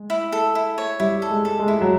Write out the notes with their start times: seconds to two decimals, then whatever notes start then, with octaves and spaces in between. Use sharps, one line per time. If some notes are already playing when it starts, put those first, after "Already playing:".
Already playing: G#3
0.10 E4
0.32 A4
0.55 E4
0.78 C#5
1.00 G3 E4
1.22 A4
1.30 G#3
1.45 A4
1.59 G#3
1.68 E4
1.81 F#3